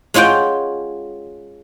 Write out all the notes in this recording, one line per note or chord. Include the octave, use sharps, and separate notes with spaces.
G#3 C#4 F4 F#5 G5